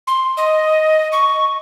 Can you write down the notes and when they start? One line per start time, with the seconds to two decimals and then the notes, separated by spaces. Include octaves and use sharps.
0.07 C6
0.37 D#5
1.12 C#6